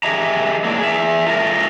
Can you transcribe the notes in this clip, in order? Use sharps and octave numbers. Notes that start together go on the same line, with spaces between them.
G4 G#4 D#5 E5 A#5
F#3 A#3 C#4 D4 E4
G#4 E5
F4 A4 A#4